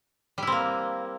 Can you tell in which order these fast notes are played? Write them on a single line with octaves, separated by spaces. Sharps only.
G3 E4 C4 A#3